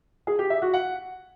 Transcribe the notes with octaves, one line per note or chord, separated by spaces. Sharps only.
G#4
G4
E5
F#4
F#5